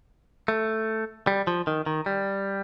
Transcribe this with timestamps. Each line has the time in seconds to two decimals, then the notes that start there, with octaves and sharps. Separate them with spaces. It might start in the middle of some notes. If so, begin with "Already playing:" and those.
0.48 A3
1.27 G3
1.47 F3
1.67 D#3
1.86 D#3
2.06 G3